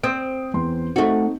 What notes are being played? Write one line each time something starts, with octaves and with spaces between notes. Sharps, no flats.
C4 D#6 G6 D7
E2 C6
A3 C4 D#4 F#4